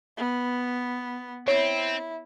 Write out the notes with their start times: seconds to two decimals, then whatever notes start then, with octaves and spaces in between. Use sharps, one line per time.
0.17 B3
1.48 C4 E4 C#5